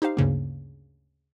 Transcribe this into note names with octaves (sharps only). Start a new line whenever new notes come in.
D#4 G4 C5 F5
D2 G2 C#3 A#3